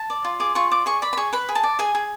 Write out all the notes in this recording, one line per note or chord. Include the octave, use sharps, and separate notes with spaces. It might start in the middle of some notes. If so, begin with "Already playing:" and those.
Already playing: A5
D5
F4
G#4 D6
F4 C#6
D5 D6
G#4 C#6
D5 B5
B5
G#4 C#6
B4 B5
G#4
A5
D5
G#4 G#5
G#4